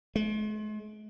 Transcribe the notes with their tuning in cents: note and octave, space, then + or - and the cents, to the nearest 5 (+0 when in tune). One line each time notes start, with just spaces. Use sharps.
G#3 +45